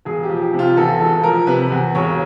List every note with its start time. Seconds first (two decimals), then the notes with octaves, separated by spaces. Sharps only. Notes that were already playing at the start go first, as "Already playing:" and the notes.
0.05 E1 G#4
0.23 G4
0.29 F3
0.41 G4
0.54 C3
0.59 F4
0.76 E2 A4
1.01 E1 A4
1.23 F3 A#4
1.47 C3 B4
1.71 E2
1.95 E1 C#5